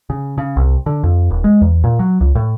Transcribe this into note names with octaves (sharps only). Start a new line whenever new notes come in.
C#3
C#3
C2
D3
F2
D#1
G#3
E2
A#2
F#3
C#2
A2